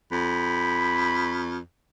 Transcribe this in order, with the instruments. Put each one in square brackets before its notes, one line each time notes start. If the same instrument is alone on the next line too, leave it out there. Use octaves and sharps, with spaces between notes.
[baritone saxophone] F2 [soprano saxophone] B5